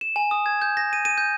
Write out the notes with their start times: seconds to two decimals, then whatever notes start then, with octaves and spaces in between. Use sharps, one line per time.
0.01 E7
0.16 G#5
0.31 D#6
0.46 G#6
0.62 G6
0.77 A#6
0.93 D#7
1.05 D#7
1.18 G6